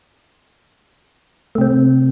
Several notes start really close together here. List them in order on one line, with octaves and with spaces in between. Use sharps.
A3 C3 C4